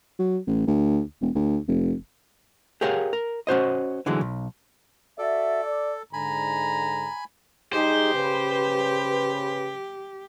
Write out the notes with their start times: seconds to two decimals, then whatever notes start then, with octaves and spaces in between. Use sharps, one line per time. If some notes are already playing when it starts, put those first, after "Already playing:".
0.19 F#3
0.47 A1
0.67 D2
1.22 E1
1.35 D2
1.68 F1
2.81 G4 G#4 A#4 C#5 F5 F#5
3.13 A#4
3.47 C#4 F#4 C5 D#5
4.06 D3 E3 F#3 G#3
4.21 B1
5.18 F#4 A4 D5 E5
5.64 D5
6.13 G#2 D3 G#5 A#5 B5
7.73 G3 D#4 G4 G#4 C5
8.14 C#3 B4